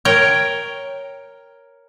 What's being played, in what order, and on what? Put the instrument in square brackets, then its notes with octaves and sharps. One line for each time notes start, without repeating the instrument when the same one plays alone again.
[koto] A#4 C#5 G5